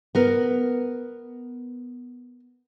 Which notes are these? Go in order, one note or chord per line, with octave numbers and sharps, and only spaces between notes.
B3 A#4